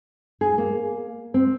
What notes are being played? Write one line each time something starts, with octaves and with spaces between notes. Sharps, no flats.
G#4
A#3
C4